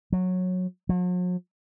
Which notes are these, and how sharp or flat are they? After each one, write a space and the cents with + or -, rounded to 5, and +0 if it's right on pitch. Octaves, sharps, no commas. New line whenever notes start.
F#3 -15
F#3 -45